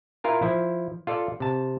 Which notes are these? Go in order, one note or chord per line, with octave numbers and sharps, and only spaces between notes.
E4 F4 A#4 G#5
F3 E4
F4 A4 D5
C3 A5